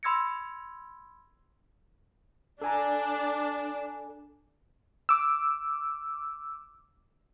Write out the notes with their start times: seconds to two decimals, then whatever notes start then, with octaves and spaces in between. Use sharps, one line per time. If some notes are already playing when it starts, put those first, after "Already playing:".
0.03 B5 C6 E6 G#6 A#6 C#7
2.62 D4 A4 G#5 A#5
5.09 D6 E6